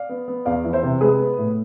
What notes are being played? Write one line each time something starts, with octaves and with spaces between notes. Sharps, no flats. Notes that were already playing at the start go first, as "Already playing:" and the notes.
Already playing: D5 F5
B3
B3
E2 D5 F5
E3
C5 E5
C3
G#3 G#4 B4
B3
A2